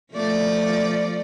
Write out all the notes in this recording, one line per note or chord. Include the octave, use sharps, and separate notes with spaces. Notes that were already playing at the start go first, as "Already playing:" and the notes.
F3 A3 D5